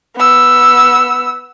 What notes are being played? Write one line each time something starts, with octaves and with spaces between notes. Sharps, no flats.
B3 E6